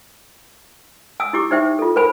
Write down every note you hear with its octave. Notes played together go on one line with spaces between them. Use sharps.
G#5 D#6 E6
E4 G4 D6
D#4 G4 C5 E5 G5
F4 A4
A#4 C5 G#5 B5